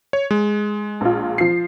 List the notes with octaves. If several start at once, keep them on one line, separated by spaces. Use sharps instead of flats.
C#5
G#3
A#1 F4
F3 C7